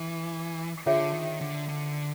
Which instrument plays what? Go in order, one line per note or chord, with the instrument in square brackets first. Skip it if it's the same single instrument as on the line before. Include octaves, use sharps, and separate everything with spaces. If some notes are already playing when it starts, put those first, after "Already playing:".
Already playing: [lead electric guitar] E3
[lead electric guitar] D3 [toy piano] F4 G#4 C#5 E5 G5
[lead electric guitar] D#3
D3
D3